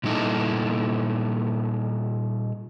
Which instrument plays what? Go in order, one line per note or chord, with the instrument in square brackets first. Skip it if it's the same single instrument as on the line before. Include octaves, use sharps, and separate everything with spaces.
[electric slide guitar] A#2 G3 D#4 E4 A4